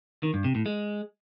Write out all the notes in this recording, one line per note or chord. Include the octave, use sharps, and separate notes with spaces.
D#3
G2
C3
A2
G#3